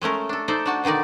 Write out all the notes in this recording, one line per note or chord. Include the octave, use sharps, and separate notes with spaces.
G#3 A3 C#4 A#4
D4 A4
D#4 A4 C5 D5
D4 F#4 A5
B2 D3 D#3 D#4 D5